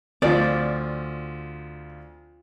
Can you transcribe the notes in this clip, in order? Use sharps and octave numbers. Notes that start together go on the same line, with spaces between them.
D2 F3 C4 F4 D5